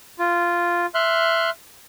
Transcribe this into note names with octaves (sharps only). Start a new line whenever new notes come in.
F4
E5 C6 F6 F#6